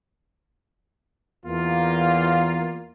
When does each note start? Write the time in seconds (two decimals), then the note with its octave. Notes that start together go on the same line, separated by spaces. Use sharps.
1.45 E2 A#3 F4